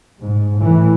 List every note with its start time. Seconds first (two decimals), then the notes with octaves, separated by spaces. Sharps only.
0.23 G#2
0.59 A2 E3